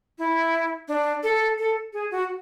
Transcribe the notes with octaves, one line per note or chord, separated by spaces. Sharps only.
E4
D4
A4
A4
G#4
F#4